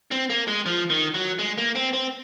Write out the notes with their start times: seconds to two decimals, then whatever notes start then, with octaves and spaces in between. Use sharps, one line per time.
0.11 C4
0.30 A#3
0.48 G#3
0.66 F3
0.90 D#3
1.14 F#3
1.39 G#3
1.58 A#3
1.75 C4
1.93 C4